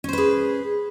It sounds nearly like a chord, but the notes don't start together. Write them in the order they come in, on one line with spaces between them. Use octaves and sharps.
C#4 C5 B4 G#4